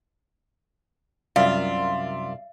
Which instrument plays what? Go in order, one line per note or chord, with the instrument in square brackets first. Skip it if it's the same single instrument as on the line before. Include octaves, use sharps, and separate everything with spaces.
[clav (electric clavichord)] C2 F#2 [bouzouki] F4 [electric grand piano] D5 E5 [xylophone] F5